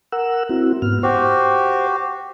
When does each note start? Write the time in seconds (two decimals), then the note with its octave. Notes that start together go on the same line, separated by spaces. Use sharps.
0.12 A#4 F#5 E6
0.49 C4 E4 F#4
0.82 G#2 B3 F6
1.03 F#4 G4 C5